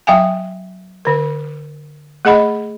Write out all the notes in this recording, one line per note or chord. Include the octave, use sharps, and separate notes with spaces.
F#3 E5 F5 G5 G#5
D3 A#4
A3 G#4 D#5 F#5 B5